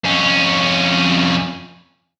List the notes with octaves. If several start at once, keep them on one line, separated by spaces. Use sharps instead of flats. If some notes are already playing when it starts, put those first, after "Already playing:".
F2 C#4